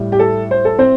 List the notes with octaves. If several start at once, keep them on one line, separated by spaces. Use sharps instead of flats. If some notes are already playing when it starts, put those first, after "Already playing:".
Already playing: A2 G3
G4
A4
C5
A4
C4 C5